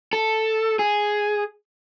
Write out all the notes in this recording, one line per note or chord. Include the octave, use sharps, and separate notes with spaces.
A4
G#4